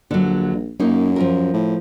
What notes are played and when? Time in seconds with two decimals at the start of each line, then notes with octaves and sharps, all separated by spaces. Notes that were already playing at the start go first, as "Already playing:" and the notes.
0.11 A#1 D3 F#3
0.80 F#2 A#3 C#4 D#4
1.16 F3 F4 A#4
1.54 A2